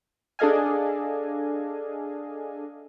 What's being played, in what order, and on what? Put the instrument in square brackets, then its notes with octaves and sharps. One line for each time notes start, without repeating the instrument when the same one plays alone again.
[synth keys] D4 G#4 A4 D#5 F5 G#5